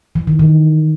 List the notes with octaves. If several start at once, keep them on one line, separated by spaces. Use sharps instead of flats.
E3
D#3
D#3